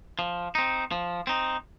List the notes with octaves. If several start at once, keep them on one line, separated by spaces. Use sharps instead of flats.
F3
C4 D#4
F3
C4 D#4